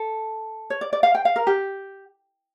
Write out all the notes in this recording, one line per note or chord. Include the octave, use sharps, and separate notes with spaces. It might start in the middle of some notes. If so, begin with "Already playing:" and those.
Already playing: A4
C#5
D5
D5
F5
G5
F5
A#4
G4